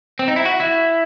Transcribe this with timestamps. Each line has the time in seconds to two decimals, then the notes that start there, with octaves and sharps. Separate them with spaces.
0.19 C4
0.28 D#4
0.36 E4
0.45 F#4
0.60 E4